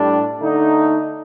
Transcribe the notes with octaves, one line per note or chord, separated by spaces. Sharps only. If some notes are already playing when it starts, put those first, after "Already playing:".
Already playing: A2 G3 D4
D3 A3 D#4